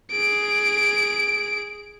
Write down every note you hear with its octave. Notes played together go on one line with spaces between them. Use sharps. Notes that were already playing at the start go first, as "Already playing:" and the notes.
G#4 D7